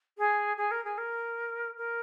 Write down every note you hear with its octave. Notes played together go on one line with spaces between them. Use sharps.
G#4
G#4
A#4
G#4
A#4
A#4